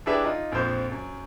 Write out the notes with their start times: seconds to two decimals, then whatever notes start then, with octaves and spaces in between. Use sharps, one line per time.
0.06 D4 E4 G4 G#4 B4 E5
0.24 D#4 F4 D#5
0.52 A#1 F2 F3 C5 G6
0.92 F#2